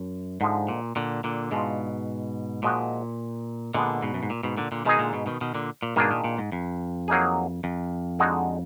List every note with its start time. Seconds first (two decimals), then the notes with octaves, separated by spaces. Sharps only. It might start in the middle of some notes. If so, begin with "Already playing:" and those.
Already playing: F#2
0.41 G#2 D3 F3 G#3
0.69 A#2
0.96 A#2 D3
1.24 A#2 D3
1.51 G#2 B2 G#3 D4 F4
2.63 A#2 F3 G#3 D#4 F#4
3.74 A#2 D3 G#3 B3 D4
4.02 G#2 B2
4.14 F#2
4.23 G#2
4.30 A#2
4.43 G#2 B2
4.57 A#2 D3
4.72 A#2 D3
4.85 B2 D#3 G#3 D#4 G#4
4.99 A#2 D3
5.13 G#2 B2
5.26 B2 D#3
5.41 B2 D#3
5.55 A#2 D3
5.83 A#2
5.96 G#2 B2 D#3 A#3 D4 G#4
6.11 A#2
6.24 A#2
6.38 G#2
6.52 F2
7.08 F#3 A#3 D#4 G#4
7.64 F2
8.19 D3 G#3 D#4 F#4